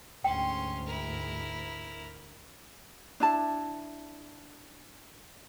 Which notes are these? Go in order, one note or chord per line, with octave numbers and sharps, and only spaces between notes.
D2 G#2 C#4 G5 C6
E4 A#4
D4 E4 A5